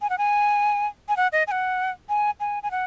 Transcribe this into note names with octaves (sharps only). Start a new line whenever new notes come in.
G#5
F#5
G#5
G#5
F#5
D#5
G#5
F#5
G#5
G#5
G#5
F#5